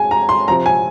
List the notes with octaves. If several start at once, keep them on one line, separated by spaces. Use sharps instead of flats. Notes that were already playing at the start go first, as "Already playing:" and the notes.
Already playing: G#3 G#5
A#5
C6
C3 F3 C4 A#5
G#5